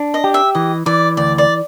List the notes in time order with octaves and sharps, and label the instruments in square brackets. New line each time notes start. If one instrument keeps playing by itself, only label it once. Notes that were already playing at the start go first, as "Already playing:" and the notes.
Already playing: [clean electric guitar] D4
[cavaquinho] D#5
[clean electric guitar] G4
[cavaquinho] E5
[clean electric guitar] E3 [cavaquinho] D#5
[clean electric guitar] E3 [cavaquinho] D5
[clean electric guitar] D2 [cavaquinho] D5
[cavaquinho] D5